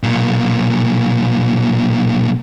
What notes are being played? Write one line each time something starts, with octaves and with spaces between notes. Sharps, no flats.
B1 A#2